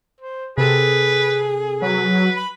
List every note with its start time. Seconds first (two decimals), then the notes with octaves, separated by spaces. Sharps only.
0.20 C5
0.58 C3 G#4 A4 B4
1.82 F#3 B4
2.37 B5